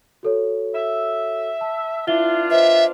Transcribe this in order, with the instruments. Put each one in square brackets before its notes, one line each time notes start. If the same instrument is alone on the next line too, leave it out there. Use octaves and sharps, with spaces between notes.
[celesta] F#4 A4 C#5
[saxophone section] E5
[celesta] A5
[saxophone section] B3 D4 F4 [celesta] E4 E5 G7
[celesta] B4 C5 D#5 [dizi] E5